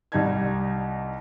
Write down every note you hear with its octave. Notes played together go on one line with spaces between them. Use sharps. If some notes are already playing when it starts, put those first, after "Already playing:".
C2 G3 D#4 D#5 A5 G#6